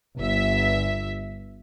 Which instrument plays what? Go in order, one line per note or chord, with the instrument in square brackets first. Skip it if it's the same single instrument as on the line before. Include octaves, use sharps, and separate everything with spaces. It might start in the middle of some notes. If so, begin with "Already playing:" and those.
[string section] G1 E5